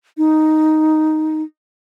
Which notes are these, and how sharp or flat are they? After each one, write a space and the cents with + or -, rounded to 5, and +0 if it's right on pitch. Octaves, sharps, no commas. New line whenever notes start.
D#4 +0